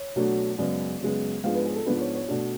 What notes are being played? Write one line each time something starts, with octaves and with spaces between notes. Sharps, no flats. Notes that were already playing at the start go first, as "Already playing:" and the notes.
Already playing: C#5
B2 F#3 A3 D4
F#2 C#3 G#3 B3 D5
F#2 C#3 G#3 B3
G#2 F3 G#3 B3 D4 F5
B4
G#4
A4
G#2 F3 G#3 B3 D4 B4
C#5
C#5
B2 A3 D4 D5